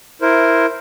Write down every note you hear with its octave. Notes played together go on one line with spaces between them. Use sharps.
E4 A#4 C5